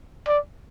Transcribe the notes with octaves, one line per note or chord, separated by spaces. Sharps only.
D5